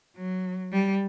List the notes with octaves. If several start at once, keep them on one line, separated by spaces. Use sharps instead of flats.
F#3
G3